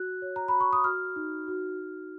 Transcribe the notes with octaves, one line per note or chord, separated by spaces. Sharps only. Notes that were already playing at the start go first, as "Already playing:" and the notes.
Already playing: F#4 F#6
C#5
A#5
F#4 B5
C#6
D#6
F#4 F6
D#4
F#4
F#4